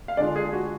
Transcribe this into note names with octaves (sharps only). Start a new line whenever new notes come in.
F5
D3 G#3 D4 F4 D5
G#4
F#4